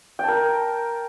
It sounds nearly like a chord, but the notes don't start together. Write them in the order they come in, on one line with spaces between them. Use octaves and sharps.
G5 A5 A#4